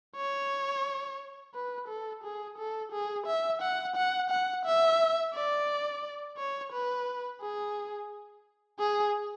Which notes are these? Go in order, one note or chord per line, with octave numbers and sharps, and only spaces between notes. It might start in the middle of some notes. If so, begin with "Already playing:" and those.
C#5
B4
A4
G#4
A4
G#4
E5
F#5
F#5
F#5
E5
D5
C#5
B4
G#4
G#4